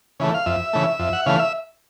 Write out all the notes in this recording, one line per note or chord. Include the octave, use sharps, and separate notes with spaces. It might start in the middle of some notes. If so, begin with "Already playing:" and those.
C#3 E3 A3
F5
F2 E5
C#3 E3 A3
F2
F#5
C#3 E3 A3 F5
E5